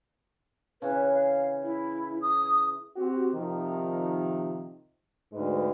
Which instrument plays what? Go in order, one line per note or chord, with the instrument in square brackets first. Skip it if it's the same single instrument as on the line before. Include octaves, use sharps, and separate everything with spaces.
[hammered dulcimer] C#3 E3 [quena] B4
[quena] F5
E4
D#6
[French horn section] C4 F#4 G4
C3 D#3 F3
D2 G#2 G#3 B4